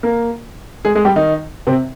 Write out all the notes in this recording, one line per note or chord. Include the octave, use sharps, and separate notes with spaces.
A#3 A#4
G#3 G#4
G#3 G#4
G3 G4
D#3 D#4
C3 C4